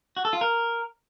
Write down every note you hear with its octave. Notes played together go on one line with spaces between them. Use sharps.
F#4
A4
F4
A#4